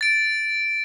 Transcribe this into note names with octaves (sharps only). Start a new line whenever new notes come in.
A6 D7